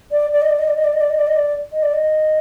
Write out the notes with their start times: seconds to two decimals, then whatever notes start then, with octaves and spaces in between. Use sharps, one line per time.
0.11 D5
0.32 D5
0.42 D#5
0.50 D5
0.59 D#5
0.67 D5
0.76 D#5
0.84 D5
0.93 D#5
1.01 D5
1.10 D#5
1.18 D5
1.27 D#5
1.36 D5
1.72 D#5
1.83 D5
1.93 D#5